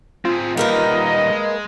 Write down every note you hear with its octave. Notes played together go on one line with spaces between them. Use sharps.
C4 F4 G#4
D#3 G3 A#3 A#4 B4 D#5
G#3